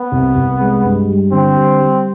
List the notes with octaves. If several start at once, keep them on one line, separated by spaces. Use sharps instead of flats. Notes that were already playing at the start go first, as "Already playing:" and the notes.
Already playing: B3
C2
C2
G#3
G2
G3
D3 C4
G3
G3